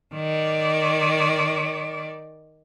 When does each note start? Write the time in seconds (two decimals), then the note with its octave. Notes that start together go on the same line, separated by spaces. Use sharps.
0.15 D#3 D5